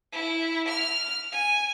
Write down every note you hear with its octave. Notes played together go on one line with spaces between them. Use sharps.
E4
F6
G#5